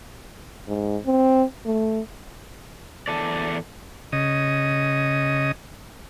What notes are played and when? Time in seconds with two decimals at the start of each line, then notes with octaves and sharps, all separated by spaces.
0.68 G#2
1.06 C4
1.66 A3
3.08 E2 A4 D5
4.12 C#3 D#5